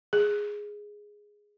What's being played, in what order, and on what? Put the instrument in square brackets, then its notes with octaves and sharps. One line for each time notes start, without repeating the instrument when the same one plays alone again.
[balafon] G#4